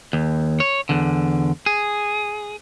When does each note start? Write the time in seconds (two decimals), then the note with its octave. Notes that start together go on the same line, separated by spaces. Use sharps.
0.13 D#2
0.60 C#5
0.89 E2 D3
1.66 G#4